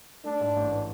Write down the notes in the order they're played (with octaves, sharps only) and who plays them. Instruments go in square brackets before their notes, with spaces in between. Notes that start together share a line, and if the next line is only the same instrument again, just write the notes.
[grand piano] A3 [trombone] D4
[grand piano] G#2
A1
E3